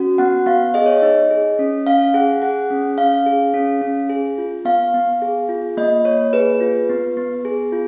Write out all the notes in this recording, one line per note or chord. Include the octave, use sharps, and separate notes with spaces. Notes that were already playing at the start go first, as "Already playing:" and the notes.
Already playing: C#4 F#4
B3 F#5
B3 F5
G#4 D#5
C#5
D#5
D#4
G#4
C#4
C#4 F5
G#4 F#5
G#4 F#5
C#4
C#4 F5
G#4
C#4
C#4
G#4
F4
B3 F5
B3
G#4
F4
A#3 D#5
A#3 C#5
G#4 B4
F4
B3
B3
G#4
F4